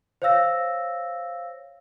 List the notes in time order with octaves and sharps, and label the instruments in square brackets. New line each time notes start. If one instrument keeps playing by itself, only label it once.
[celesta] C5 C#5 F5 E6 A#6